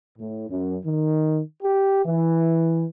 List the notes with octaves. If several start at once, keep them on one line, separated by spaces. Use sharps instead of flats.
A2
F#2
D#3
G4
E3